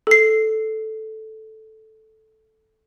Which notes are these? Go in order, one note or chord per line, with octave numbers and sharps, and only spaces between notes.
A4 C7